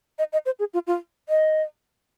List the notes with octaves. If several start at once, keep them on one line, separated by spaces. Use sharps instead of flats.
D#5
D#5
C5
G#4
F4
F4
D#5